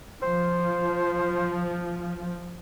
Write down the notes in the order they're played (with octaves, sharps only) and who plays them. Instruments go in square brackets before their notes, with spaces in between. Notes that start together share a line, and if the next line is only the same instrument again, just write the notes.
[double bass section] F3 [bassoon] C5